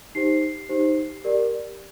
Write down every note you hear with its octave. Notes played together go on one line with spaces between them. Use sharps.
D#4 G4 C5 C7
D#4 G4 C5
G4 A#4 D5